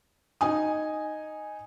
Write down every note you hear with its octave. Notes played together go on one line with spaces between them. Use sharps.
D#4 G#5 D#6